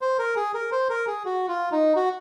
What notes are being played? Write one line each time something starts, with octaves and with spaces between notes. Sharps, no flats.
C5
A#4
G#4
A#4
C5
A#4
G#4
F#4
F4
D#4
F#4